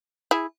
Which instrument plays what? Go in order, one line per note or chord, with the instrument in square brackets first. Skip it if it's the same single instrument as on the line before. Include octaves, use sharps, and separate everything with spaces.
[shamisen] E4 G#4